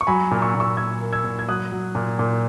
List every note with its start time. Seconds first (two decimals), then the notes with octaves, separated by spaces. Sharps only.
0.01 C#6
0.07 F#3 G#5 B5
0.31 A#2
0.42 C#6 E6
0.55 A#2
0.60 C#6 E6
0.77 A#2 E6 G#6
1.01 A#3
1.13 E6 G#6
1.24 A#2
1.39 G#6
1.48 F#3 D#6 F#6
1.72 F#3
1.95 A#2
2.19 A#2